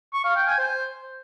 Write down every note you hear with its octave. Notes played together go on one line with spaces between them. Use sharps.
C#6
F5
G5
G#5
C5